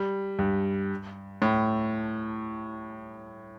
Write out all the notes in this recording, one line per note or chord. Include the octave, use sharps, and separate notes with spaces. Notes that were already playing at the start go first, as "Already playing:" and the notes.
Already playing: G3
G2
A2